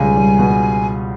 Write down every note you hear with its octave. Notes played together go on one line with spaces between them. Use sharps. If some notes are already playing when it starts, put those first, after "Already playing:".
Already playing: C#2 B2 G3 G#5
G3
B2